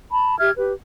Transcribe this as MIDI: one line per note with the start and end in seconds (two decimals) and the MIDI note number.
0.11 0.37 81
0.11 0.37 83
0.39 0.51 67
0.39 0.51 76
0.39 0.51 89
0.39 0.51 92
0.57 0.72 67
0.57 0.72 71